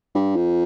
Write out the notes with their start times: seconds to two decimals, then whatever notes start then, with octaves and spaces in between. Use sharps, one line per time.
0.15 G2
0.36 F2